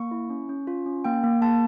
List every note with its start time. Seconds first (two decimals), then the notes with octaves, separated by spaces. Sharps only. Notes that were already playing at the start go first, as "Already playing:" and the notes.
Already playing: A#3 C#6
0.11 E4
0.30 C#4
0.49 C#4
0.67 F4
0.86 C#4
1.04 A#3 G5
1.24 A#3
1.42 A#3 A5